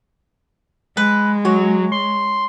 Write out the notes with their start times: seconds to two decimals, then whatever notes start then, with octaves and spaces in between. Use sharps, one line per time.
0.97 G#3 B4
1.45 F#3 C#5
1.92 C6